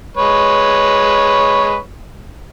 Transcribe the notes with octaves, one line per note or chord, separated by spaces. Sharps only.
G#3 B4 C#5